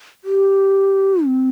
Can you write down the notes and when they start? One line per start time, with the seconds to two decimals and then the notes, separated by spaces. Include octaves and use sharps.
0.24 G4
1.26 C4